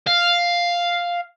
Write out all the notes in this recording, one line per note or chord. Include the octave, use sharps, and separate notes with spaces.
F5